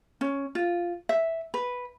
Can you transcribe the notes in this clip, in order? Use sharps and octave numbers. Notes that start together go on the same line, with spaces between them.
C#4
F4
E5
B4